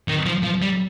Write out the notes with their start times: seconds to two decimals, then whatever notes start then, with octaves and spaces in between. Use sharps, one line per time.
0.08 D#3
0.26 F3
0.43 F3
0.62 G3